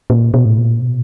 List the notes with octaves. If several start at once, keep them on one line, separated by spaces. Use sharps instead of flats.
A#2
B2
A2
A#2
B2